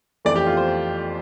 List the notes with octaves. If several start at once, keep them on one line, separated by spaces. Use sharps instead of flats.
F2 E3 A3 D5
G4
F4
C5